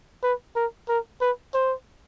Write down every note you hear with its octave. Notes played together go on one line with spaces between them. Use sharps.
B4
A#4
A#4
B4
C5